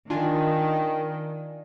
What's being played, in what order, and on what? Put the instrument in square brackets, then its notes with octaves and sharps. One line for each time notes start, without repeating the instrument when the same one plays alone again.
[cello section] D#3 [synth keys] D4 F4 G#5